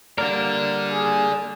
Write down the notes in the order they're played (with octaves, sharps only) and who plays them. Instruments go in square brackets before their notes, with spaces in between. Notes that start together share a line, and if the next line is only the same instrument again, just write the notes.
[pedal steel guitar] G3 A#3 A#4 [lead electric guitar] A4 D5
[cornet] G#4